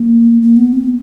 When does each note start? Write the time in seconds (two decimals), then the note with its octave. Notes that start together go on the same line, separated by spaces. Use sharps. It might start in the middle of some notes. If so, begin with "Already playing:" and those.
Already playing: A#3
0.42 A#3
0.57 B3
0.73 C4